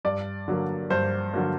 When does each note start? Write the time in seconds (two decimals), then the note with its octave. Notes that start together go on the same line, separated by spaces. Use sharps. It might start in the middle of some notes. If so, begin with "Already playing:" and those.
0.05 G2 D5
0.48 D3 F#3 A#3
0.90 G2 C5
1.34 D3 F#3 A#3